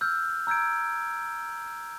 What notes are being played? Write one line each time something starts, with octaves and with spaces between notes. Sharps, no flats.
E6 F6 G6
A#5 E6 G6 G#6 D7